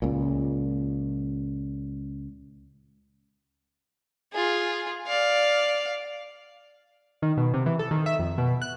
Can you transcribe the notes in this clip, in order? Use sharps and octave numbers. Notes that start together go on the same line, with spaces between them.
C#2 A#2
F4 G#4
D5 F5
D#3
B2
C3
E3
A4
D#3
E5
F2
B2
F#6